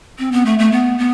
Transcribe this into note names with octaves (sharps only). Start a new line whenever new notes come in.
C4
B3
A3
A3
B3
B3